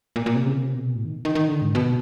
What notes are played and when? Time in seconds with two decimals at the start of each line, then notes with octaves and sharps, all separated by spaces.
0.16 A#2
0.26 A#2
0.35 C3
0.46 C#3
0.56 C3
0.75 B2
0.96 A2
1.05 D#3
1.25 D#3
1.35 D#3
1.48 D3
1.62 G#2
1.75 B2